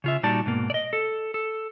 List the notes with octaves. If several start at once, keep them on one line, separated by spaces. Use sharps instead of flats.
C#3 F4 E5
A#2 G3 D#4 F#4 D5 A5
G#2 B2 A#3
D5 D#5
A4
A4